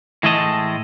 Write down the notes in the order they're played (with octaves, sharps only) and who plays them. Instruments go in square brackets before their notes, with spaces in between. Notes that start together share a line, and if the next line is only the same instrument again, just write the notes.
[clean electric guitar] A2 E3 G#3 A3 D#5 A5